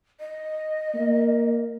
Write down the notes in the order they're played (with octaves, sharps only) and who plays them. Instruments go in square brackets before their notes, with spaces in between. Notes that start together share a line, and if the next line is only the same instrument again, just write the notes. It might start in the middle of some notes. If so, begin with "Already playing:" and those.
[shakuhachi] D#5
[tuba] A#3